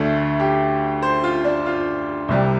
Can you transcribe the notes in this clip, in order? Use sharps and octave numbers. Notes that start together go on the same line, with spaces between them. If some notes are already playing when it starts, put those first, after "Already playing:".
Already playing: D2 D3 A3
G4
C5
F4
D4
F4
C2 C3 G3